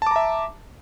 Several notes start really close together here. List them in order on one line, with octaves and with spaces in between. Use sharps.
A5 D6 A#5 E5